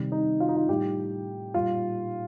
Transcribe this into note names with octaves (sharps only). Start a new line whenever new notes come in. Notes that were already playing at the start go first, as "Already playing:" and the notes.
Already playing: C3 D#3 G3
D#4
F4
D#4
F4
A2 G3 G4
A#2 G3 F4